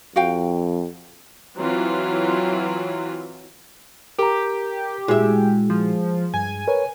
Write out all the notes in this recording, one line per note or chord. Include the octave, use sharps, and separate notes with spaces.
F2 F#4 F5 G5
E3 F#3 C4 F4
G4 A#4 A#5
A#2 G#3 E4 F#4 E5
F3
G2 G#5
A#4 B4 C#5